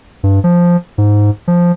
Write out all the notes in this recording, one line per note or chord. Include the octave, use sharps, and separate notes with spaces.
G2
F3
G#2
F3